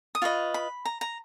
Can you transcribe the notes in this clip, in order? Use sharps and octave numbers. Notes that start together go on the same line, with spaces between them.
D#6
F4 B4 D#5 C#6
B5
A#5
A#5